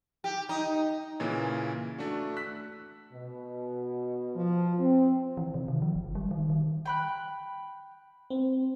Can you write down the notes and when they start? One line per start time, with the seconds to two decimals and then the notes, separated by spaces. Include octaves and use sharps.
0.24 G4
0.49 D#4
1.20 A#2 C#3 E3 A#3 C#4
1.98 A3 D4 F#4
2.37 E6 F#6 B6
3.13 B2
4.35 F3
4.79 C4
5.37 E3
5.54 C3
5.68 D#3
5.82 F3
5.95 G1
6.15 G3
6.31 D#3
6.50 D#3
6.86 G5 B5 F#6
8.30 C4